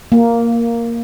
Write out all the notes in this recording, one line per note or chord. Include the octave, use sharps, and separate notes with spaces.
A#3